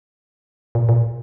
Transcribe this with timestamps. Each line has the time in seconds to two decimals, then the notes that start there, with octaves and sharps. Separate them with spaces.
0.75 A#2
0.89 A#2